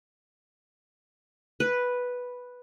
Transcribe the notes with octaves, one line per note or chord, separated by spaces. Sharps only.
B4